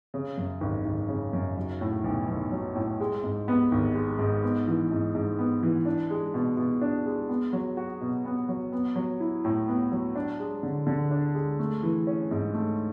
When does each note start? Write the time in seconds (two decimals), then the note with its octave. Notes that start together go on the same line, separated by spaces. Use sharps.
0.14 C#3
0.37 F#2
0.61 G#1
0.85 G#1
1.09 C#3
1.33 F#2
1.57 F#3
1.81 A2
2.04 B1
2.28 B1
2.51 F#3
2.76 A2
3.00 G#3
3.23 G#2
3.48 B3
3.72 G#1
3.95 G#3
4.19 G#2
4.43 B3
4.67 E3
4.91 G#2
5.15 G#2
5.39 B3
5.63 E3
5.85 D4
6.10 G#3
6.34 B2
6.57 B2
6.81 D4
7.06 G#3
7.29 B3
7.53 F#3
7.77 F#4
8.01 B2
8.25 B3
8.49 F#3
8.72 B3
8.96 F#3
9.20 E4
9.45 A2
9.68 B3
9.92 F#3
10.16 D4
10.40 G#3
10.63 D3
10.87 D3
11.11 D4
11.35 G#3
11.59 A3
11.83 E3
12.07 C#4
12.31 G#2
12.54 A3